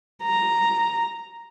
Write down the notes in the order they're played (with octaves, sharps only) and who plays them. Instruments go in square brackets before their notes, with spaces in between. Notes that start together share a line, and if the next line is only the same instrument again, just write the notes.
[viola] A#5